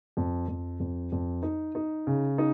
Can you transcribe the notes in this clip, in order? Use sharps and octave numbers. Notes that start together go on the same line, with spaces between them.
F2
F2
F2
F2
D#4
D#4
C#3
D#4